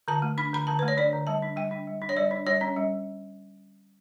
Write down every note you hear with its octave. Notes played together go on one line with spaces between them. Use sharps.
D3 A5
A3
D4 B5
D3 B5
D3 A5
A3 B4
C#5
D4 D5
D3
G3 A5
D4
G3 G5
D4
G3
D4
C#5
G3 D5
D4
G3 C#5
C#4
G3